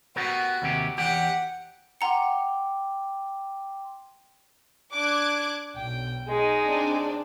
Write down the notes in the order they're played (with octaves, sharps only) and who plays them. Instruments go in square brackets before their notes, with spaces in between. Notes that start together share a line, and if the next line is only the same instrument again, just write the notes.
[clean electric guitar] B3 G4 A#4 [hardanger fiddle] F#4
[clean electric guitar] D#2 C3 G4
[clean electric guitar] E2 G4 G5 [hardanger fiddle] F#5
[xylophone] F#5 A#5 C#7 [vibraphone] G5 C6 D6
[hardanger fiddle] D4 [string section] D6 F#6 G#6
[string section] B1 [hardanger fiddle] G5
[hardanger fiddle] G#3 D#4
[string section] C4 D4 D5